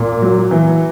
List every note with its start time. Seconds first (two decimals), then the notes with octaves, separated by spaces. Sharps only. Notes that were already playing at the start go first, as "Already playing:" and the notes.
Already playing: A#2
0.22 F#3
0.51 E3